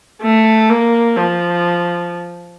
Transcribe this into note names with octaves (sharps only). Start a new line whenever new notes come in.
A3
A#3
F3